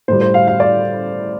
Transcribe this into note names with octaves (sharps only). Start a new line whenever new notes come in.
A2 G3 C5
C5
F5
F5
D5